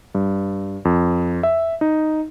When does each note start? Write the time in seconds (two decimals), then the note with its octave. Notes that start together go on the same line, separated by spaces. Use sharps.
0.15 G2
0.85 F2
1.43 E5
1.81 D#4